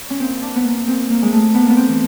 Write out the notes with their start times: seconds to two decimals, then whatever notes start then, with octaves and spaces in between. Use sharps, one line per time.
0.10 C#4
0.20 A#2 C4
0.42 D4
0.56 B3
0.65 A#3
0.87 A#2 C4
1.09 A#3
1.22 G#3
1.32 A3
1.54 A2 B3
1.62 A#3
1.69 B3
1.77 C4
1.88 E3